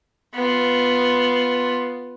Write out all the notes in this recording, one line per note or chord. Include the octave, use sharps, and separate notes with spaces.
B3 F4